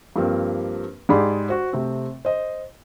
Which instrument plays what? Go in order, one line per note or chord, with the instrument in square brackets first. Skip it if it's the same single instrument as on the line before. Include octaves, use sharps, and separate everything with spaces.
[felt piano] G2 F3 A#3 C4
G#2 G4 G#4 D5 B5 C6
F#4 C5
C3 A3 C4
C5 D#5